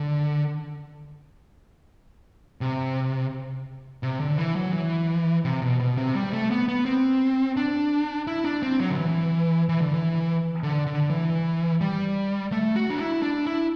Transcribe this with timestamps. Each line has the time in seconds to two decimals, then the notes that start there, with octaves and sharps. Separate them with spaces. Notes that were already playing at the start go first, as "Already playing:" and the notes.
Already playing: D3
2.61 C3
4.03 C3
4.20 D3
4.38 E3
4.56 F#3
4.73 E3
5.45 C3
5.62 B2
5.80 B2
5.98 C3
6.15 G3
6.32 A3
6.51 B3
6.68 B3
6.86 C4
7.57 D4
8.27 E4
8.44 D4
8.63 C4
8.80 F#3
8.90 D3
8.98 E3
9.69 E3
9.81 D3
9.94 E3
10.63 D3
10.87 D3
11.10 E3
11.81 G3
12.52 A3
12.76 F#4
12.90 D4
12.99 E4
13.22 D4
13.46 E4